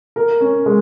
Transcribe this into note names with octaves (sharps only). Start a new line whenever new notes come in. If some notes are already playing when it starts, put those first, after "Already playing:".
A#4
C#4
G#3